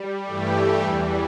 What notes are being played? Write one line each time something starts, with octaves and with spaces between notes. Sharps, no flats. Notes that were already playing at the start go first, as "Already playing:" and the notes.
Already playing: G3
G2 E3 G3 A3 G4
E2 E3 G3